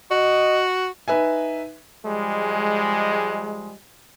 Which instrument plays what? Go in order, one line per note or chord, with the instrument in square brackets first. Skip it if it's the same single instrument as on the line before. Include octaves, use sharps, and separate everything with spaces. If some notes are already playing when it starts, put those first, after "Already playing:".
[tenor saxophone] F#4 [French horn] D#5
[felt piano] D#4 B4 E5 G#5
[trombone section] F3 G3 G#3